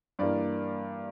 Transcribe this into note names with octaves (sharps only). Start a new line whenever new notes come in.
G2 E3 A#3 D5